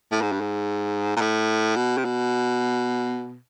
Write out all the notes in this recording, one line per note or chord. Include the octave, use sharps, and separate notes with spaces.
A2
G#2
G2
G#2
A#2
A2
B2
C3
B2